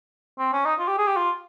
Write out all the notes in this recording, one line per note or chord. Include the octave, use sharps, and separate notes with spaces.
C4
C#4
D#4
F4
G4
G#4
G4
F4